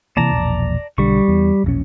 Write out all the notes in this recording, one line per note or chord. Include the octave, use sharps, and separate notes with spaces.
C3 E3 A#3 D5 A5 A#5
E1 A#1
B1 D3 G3 C#6
E2
E1 A#1 C#4